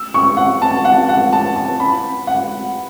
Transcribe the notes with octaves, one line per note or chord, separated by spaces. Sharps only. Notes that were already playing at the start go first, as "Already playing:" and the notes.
Already playing: E6
C#6
F#5
A5
F#5
F#5
A5
A5
B5
F#5